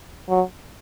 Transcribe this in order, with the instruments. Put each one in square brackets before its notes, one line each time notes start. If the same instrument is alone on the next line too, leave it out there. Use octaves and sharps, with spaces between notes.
[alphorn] F#3